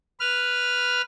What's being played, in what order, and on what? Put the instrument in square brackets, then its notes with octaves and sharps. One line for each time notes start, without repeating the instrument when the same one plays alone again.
[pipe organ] B4 F6